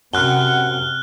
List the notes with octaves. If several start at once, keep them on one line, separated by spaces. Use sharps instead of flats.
F#2 C3 F#5 F6 F#6 G7